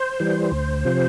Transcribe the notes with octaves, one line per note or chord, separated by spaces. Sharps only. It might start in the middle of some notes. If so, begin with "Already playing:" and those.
Already playing: C5
E3 G3
D2
C3 F3